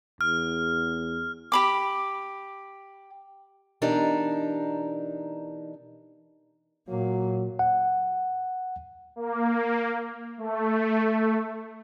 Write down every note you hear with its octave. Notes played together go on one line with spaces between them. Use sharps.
E2 F6
G4 B5 D6
B2 E3 D4 D#4 G4 A#4
A#2 F#3 A#3
F#5
A#3
A3